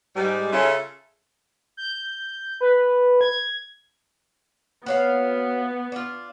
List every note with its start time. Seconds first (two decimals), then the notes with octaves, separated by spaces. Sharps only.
0.15 G#2 G3
0.51 C#3 C#4 F4 A4 E5
1.77 G6
2.61 B4
3.21 G#6
4.86 B3 F#4 C#5 F5
5.92 D4 F4